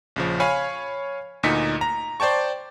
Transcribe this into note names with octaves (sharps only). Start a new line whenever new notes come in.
A#1 C#3 F3
C#5 F5 G#5 B5
D2 A#2 D#4 B6 C#7
A#5
C5 D5 G5 A5 C#6